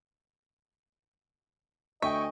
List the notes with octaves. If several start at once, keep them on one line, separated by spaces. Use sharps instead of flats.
D2 D#5 E5 G5 G#5 C#6